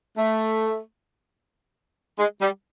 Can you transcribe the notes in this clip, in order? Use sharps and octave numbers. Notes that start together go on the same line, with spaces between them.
A3
G#3
G3